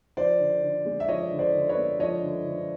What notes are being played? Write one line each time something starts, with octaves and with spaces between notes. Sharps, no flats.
F3 C5 D5
D3
D3
G#3
E5
F3 C#5 D#5
D3
C5 D5
D3
B4 C#5
G#3
F3 C#5 D#5
D3
D3